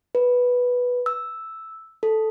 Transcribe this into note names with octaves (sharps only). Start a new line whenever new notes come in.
B4
E6
A4